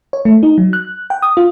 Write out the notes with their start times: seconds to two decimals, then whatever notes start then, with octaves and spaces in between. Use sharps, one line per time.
0.13 C#5
0.25 A3
0.43 D#4
0.58 F#3
0.73 F#6
1.10 G5
1.22 D#6
1.37 F4